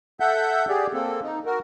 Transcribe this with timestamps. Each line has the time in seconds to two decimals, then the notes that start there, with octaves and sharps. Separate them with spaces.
0.20 A4 E5 F#5 G6
0.69 G4 G#4 D5
0.93 A#3 C4 A4
1.22 D#4
1.46 F#4 A#4